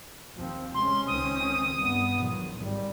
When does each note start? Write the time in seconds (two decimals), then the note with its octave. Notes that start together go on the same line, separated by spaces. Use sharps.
0.37 D#2 F3 C4
0.74 C3 G#3 C#4 C6
1.07 C#2 D#3 C4 D#6
1.76 G2 B3
2.14 A#1 D#3 F#3
2.57 G#1 G3